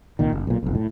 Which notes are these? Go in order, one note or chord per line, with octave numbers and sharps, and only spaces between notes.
C2 A#2 D#3
F#1
B1 A#2
F1 B1
A2